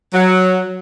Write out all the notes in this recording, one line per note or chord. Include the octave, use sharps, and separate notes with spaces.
F#3